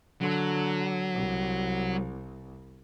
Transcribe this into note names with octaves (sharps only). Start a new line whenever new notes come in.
D3 F#3
C2